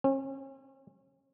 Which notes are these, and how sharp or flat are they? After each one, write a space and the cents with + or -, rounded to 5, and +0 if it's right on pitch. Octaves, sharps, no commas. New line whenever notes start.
C#4 -40